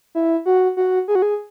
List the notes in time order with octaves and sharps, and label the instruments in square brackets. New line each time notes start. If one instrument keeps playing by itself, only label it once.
[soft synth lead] E4
F#4
F#4
G#4
F#4
G#4